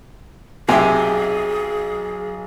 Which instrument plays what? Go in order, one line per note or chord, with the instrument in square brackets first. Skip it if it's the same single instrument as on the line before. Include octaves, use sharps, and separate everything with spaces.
[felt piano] B1 [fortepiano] C3 E5 G5 [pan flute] G#4 [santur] G#5